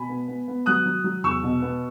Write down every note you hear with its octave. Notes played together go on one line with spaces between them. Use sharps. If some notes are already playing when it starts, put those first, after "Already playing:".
Already playing: B2 G#5 B5
B3
B3
B3
F#3 D#6 F#6
F#3
F#3
E2 C#6 E6
B2
B3